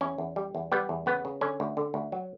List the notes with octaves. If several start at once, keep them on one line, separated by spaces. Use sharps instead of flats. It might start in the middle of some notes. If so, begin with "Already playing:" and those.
E2 C#4
E2
G3
E2
G3 B3
E2
C#3 B3
C#3
D3 C#4
D2
D3
D2
F#3